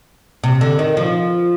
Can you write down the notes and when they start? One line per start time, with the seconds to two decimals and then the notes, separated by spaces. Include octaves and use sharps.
0.44 C3
0.61 D3
0.79 D#3
0.97 F3